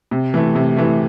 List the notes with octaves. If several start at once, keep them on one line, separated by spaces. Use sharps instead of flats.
C3
E3 A3
C3
E3 A3